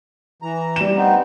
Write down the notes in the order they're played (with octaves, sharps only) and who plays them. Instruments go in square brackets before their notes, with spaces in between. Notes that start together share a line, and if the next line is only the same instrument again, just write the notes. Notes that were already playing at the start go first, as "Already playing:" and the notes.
[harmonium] E3 A#5
[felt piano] G3 E7
[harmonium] B3 C4 D#4